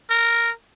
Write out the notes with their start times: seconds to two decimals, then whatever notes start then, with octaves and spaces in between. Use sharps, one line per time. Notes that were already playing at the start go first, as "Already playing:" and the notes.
0.10 A#4